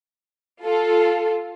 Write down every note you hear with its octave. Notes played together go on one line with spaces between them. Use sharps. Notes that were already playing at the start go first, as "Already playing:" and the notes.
F4 A4